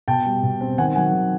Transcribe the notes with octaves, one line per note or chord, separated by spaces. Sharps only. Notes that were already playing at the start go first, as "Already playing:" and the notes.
B2 G5 A5
G3
B2
C4
D#3 F#5 G#5
F#3 F#5 G#5
D#3